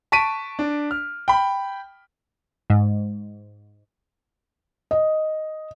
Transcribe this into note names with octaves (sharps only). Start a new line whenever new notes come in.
A5 C#6 B6 D7 D#7
D4
F6
G5 B5
G#2
D#5